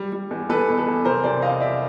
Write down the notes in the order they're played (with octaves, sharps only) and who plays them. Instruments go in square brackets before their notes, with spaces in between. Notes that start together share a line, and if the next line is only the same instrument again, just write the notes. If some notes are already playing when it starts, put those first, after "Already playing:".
Already playing: [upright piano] G3
G3
E2
E2 A4 B4
B2
A4 B4
E2
C2 A#4 C5
C2 C5 D5
C2 D#5 F5
C2 D5 E5